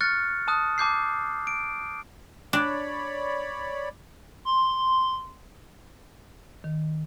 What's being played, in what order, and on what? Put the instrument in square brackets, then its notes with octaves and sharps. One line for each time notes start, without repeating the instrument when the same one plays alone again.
[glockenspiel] C#6 F6 F#6 A6 C#7
A5 D#6 F#6
A5 D6 G6 C7
D7
[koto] D4 [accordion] C#5 D5 B5
[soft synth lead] C6
[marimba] D#3